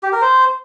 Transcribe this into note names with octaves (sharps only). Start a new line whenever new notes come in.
G4
A#4
C5